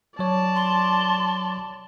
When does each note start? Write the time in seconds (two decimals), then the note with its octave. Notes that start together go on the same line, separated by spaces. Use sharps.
0.19 F#3 C#5 D5 A5
0.55 C6